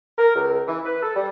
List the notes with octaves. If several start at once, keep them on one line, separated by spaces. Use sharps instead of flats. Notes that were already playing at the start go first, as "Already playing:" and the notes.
A#4
C#2
E3
B4
A4
G3